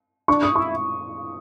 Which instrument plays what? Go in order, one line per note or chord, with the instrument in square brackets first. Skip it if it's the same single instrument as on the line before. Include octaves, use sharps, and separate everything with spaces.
[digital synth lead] D4 [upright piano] C#6
[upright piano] D#6
[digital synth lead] E4 [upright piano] C#6